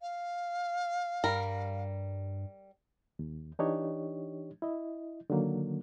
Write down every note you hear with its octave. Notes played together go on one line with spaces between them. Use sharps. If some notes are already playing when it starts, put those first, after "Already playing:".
F5
G2 G3 A#4
D#2
E3 D4 D#4 G4 C#5 D#5
E4 D#5
D3 D#3 F#3 A#3